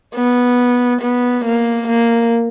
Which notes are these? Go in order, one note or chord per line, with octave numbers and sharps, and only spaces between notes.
B3
B3
A#3
A#3